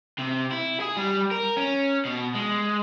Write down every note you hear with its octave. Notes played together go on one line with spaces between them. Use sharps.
C3
E4
G#4
G3
A#4
C#4
B2
G#3